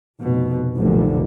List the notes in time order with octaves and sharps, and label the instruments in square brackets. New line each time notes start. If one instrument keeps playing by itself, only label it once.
[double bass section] F1 B2
F1 B1 A#2 D3